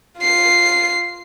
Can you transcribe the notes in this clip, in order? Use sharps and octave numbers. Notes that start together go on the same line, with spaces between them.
F4 C7